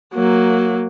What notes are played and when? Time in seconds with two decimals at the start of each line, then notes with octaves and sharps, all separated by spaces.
0.14 F#3 A#3